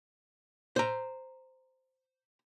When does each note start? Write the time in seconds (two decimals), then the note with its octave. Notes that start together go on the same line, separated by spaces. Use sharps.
0.76 C5 A#5